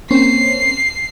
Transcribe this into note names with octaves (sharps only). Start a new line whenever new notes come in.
A#3 C4 C#4 C7